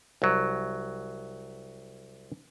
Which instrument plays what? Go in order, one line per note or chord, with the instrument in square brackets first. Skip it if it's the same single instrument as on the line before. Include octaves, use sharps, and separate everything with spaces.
[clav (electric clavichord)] C2 F#3